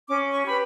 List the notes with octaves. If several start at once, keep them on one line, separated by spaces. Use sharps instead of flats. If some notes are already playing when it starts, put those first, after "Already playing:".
C#4 D6
C#6
G4 B4 B5